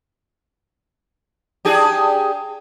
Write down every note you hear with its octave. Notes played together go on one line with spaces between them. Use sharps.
D4 G4 G#4